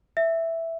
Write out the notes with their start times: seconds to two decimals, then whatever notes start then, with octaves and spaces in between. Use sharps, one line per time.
0.17 E5